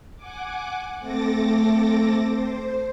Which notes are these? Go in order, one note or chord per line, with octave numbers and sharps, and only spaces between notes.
F#5 G#5 D6
A3 C4 A4 D6 A6 A#6
C5